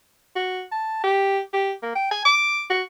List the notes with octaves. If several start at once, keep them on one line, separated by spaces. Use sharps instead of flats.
F#4
A5
G4
G4
A#3
G5
G#5
D6
F#4